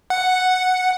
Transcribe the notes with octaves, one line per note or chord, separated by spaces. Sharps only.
F#5